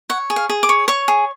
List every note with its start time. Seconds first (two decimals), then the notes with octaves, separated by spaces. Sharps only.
0.10 C#5 F#5
0.30 G#4
0.36 F5
0.50 G#4
0.63 D6
0.69 C#5
0.88 C#5 C#6
1.08 G#4